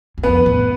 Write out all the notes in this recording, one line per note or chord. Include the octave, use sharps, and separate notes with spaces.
E2
F2 B3 B4
A2